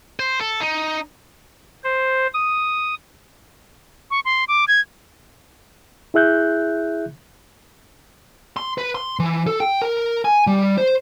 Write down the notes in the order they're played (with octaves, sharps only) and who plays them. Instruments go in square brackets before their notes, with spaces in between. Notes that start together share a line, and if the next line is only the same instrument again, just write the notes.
[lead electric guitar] C5
A4
D#4
[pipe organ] C5
D#6
[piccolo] C#6
C6
D6
G#6
[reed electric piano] E4 G#4 E5 F#6 G6
[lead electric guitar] C6
B4
C6
E3
A4
G5
A#4
G#5
G3
C5